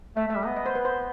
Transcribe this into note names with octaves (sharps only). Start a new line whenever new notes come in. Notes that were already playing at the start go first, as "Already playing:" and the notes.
A3 E5
A3 E5
G3
B3 D#5
D#5
C5
B4
C5